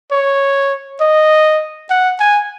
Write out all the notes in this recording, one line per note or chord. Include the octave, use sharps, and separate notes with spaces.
C#5
D#5
F#5
G#5